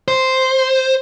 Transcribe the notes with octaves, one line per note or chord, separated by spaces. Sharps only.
C5